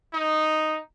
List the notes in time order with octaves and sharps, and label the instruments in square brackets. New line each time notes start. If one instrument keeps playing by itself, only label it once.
[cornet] D#4